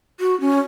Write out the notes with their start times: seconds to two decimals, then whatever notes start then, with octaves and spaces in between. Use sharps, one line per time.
0.20 F#4
0.41 C#4